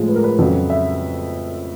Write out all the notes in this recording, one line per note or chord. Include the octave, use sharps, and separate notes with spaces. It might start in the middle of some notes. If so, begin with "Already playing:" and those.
Already playing: A2 F3 G#3
B4
A#4
B4
F2 C#3 F#3
E5